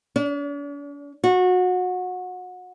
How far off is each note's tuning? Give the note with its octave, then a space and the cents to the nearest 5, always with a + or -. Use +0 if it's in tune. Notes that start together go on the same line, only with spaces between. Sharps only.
D4 -45
F#4 -25